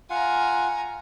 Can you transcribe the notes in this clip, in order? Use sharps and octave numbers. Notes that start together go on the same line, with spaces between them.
F4 F5 F#5 G#5 A#5